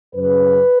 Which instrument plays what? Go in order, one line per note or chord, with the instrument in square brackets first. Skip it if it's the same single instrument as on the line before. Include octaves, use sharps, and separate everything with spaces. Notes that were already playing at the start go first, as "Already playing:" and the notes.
[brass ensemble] F#2 C#3 B4